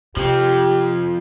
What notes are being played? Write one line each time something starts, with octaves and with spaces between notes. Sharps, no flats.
C3 F3 C4 G4